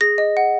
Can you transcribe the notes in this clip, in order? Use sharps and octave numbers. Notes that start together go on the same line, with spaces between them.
G#4 A#6
D#5
F#5